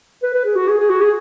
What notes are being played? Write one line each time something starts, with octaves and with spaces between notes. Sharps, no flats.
B4
B4
G#4
F#4
G#4
G#4
F#4
G#4